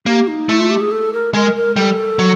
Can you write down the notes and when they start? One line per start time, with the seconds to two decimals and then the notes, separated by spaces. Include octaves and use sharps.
0.06 A#3 G4
0.28 D#4
0.48 A3 E4
0.59 F4
0.70 G4
0.81 G#4
0.91 A4
1.13 A#4
1.34 G#3 A#4
1.56 A#4
1.76 G3 A4
2.19 F#3